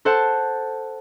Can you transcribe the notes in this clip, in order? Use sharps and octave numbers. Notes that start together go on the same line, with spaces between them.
A4 C5 F#5 A5